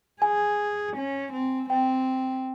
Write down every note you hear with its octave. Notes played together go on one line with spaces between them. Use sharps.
G#4 G#5
C#4
C4
C4 G5